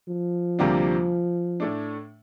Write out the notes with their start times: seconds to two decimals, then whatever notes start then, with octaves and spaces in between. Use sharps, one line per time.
0.09 F3
0.59 D2 C3 G3 A#3 D4
1.60 A2 A3 D4